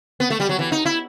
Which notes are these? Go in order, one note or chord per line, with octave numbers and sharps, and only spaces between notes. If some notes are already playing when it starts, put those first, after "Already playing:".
B3
A3
G3
F#3
E3
D#4
E4